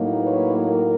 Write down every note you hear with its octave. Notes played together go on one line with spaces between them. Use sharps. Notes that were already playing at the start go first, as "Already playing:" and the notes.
Already playing: A2 F#3 A#3 D#4
B4 C#5
A#4